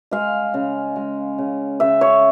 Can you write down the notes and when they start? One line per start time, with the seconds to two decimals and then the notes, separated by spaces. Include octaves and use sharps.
0.11 G#3 F5
0.54 C#3
0.96 G#3
1.38 C#3
1.80 C#3 E5
2.01 C#5